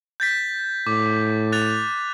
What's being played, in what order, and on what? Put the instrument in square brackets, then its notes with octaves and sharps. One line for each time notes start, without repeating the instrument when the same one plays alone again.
[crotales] G6 A6 B6
[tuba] A2 [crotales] D6
[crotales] F#6 A6 F7